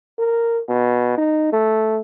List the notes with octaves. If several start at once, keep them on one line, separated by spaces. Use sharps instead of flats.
A#4
B2
D#4
A3